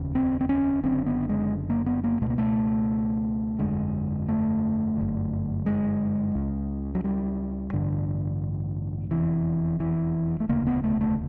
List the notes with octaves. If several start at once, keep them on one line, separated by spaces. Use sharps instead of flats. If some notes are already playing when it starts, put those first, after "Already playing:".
Already playing: F1 D#2 C#3
C4
C4
C#4
F#1 F#2 D3 C4
B3
G#3
A#3
B3
A#3
C#2 B2 A3
A#3
A3
G1 F2 D3 G#3
A3
G1 F#2 D3
G#3
C#2 C#3
F#3
G3
A1 G2 D3
F1 E2 C3 E3
E3
A3
E1 D2 C#3 A#3
B3
A3
A3